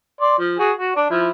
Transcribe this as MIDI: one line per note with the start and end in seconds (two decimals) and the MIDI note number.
0.21 0.34 74
0.21 0.34 84
0.39 0.56 53
0.59 0.72 66
0.59 0.72 68
0.78 0.93 66
0.96 1.08 62
0.96 1.08 74
1.10 1.31 53
1.10 1.31 64